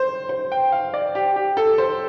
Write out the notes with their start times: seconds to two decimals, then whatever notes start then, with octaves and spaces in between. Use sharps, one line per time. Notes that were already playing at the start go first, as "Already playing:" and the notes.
Already playing: C5
0.29 C5
0.52 G5
0.72 F5
0.94 D5
1.15 G4
1.36 G4
1.57 A4
1.78 C5